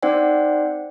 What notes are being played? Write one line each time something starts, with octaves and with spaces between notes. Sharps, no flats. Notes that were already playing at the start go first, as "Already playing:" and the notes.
C4 D#4 C5 D5 F#5 G5